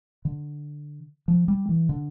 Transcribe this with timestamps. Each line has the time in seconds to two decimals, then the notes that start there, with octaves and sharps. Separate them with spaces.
0.25 D3
1.28 F3
1.48 G3
1.69 E3
1.89 D3